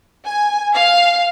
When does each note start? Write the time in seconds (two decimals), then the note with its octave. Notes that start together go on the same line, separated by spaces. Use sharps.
0.25 G#5
0.74 F5